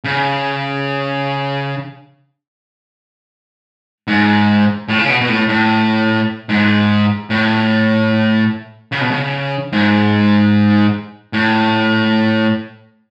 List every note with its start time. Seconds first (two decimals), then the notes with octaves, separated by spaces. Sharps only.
0.04 C#3
4.08 G#2
4.89 A2
4.99 C#3
5.09 B2
5.21 B2
5.29 A2
5.49 A2
6.49 G#2
7.30 A2
8.92 C#3
9.01 B2
9.11 C#3
9.73 G#2
11.33 A2